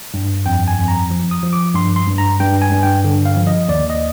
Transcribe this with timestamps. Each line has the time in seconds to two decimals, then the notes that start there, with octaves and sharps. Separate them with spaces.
0.14 G2
0.46 F2 G5
0.68 G#5
0.78 F2
0.88 A#5
1.11 F3
1.31 D#6
1.43 F3
1.53 D6
1.74 G2 C6
1.96 C6
2.07 G2
2.18 A#5
2.40 G2 G5
2.62 G#5
2.72 G2
2.83 G5
3.04 D3
3.26 F5
3.37 F3
3.47 D#5
3.68 D#2 D5
3.90 D#5